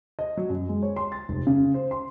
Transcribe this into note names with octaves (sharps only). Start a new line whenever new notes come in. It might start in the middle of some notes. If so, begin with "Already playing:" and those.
D#5
F#3
F#2
G#3
C#5
C6
A6
F1
C#3
C5
C6